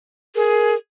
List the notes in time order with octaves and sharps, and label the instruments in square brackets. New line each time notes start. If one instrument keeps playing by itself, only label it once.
[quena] G#4 [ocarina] A#4